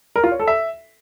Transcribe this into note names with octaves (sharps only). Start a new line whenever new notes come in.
A#4
F4
C#5
A4
E5